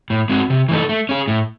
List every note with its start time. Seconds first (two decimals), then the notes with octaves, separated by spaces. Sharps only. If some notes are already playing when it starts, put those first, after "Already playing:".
0.10 A2
0.29 G#3 C4 F#4
0.50 C3
0.69 E3 A3 D#4 A4
0.89 A3
1.09 C#4 G#4
1.28 A2